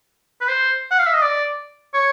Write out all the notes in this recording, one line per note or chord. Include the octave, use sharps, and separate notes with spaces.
B4
C5
F#5
F5
E5
D#5
D5
C#5